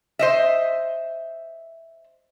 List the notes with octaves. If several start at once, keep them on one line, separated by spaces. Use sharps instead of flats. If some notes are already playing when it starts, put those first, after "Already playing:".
C5 D#5 E5